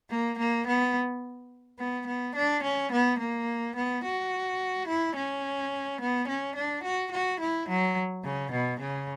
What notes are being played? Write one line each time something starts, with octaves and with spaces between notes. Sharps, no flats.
A#3
A#3
B3
B3
B3
D4
C#4
B3
A#3
B3
F#4
E4
C#4
B3
C#4
D4
F#4
F#4
E4
F#3
C#3
B2
C#3